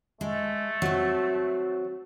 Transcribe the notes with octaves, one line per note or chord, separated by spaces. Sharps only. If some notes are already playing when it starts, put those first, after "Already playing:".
G#3 A3
F#3 C4